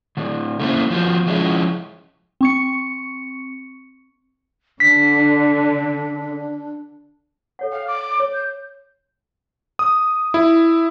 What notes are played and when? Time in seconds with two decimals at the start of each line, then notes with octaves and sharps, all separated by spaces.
0.17 A2 D3
0.60 A3 A#3 C#4 E4 C5
0.90 F3 B3 F#4 C5
1.27 F3 G#3 C#4 E4
2.41 C4 C#6 C#7
4.80 D3 D4 B6
7.59 A4 C#5 F#5
7.72 F5 G5
7.88 D6
8.20 C#5
8.34 G6
9.79 D#6
10.34 E4